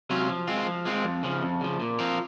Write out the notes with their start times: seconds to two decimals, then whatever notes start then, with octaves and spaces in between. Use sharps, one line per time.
0.10 C3 F#3 C#4 F4
0.29 F3
0.48 G#3 C4 F4
0.66 F3
0.85 G#3 C4 F4
1.04 F2
1.23 C#3 F3
1.42 F2
1.61 C#3 F3
1.80 A#2
1.99 F3 C4 F4 A#4